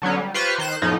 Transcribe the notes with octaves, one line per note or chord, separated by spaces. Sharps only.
D3 F#3 B3 C#4
G3
F4 G4 B4 C5 C#6 F6
D#3 C5 F#6 E7
F2 A2 F3 B3 C#4 D#4